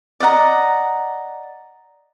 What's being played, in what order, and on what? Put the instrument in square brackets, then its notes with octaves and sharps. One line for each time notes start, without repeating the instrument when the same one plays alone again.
[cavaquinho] D5 D#5 F#5 A#5